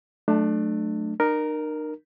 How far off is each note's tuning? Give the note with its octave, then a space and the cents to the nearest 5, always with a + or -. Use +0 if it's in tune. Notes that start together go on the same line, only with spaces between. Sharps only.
F#3 +0 A3 -10 D4 +25
D#4 -40 A#4 +0